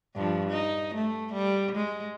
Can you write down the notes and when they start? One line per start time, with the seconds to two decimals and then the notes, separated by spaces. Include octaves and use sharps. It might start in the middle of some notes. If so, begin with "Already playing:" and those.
0.15 G2 F3
0.50 D#4
0.95 A3
1.34 G3
1.76 G#3